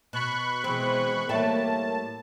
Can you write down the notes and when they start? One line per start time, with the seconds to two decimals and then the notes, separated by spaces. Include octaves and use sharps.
0.13 B2 B5 C#6 F#6
0.64 B2 E3 G#3 C4
1.29 A2 G3 A3 A#3 C#5 E5 G5 A5